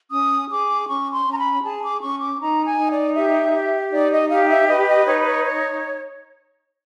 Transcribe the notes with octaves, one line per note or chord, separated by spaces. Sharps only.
C#4 D#6
G#4 D6
C#4 C#6
C6
C#4
A#5
B5
G#4 A5
D6
C#4 C#6
D6
D#4 A#5
G#5
D#4
D5
G4 E5
G4
D#4 D5
D#5
G4 F5
E5
B4 D#5
D#5
D#4 C#5
C#5
C#5